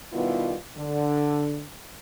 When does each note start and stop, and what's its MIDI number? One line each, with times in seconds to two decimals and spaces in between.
0.13 0.54 47
0.13 0.54 51
0.13 0.54 55
0.13 0.54 59
0.13 0.54 64
0.13 0.54 65
0.77 1.64 50